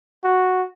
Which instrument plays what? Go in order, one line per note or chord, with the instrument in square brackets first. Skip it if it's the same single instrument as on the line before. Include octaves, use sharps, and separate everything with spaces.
[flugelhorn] F#4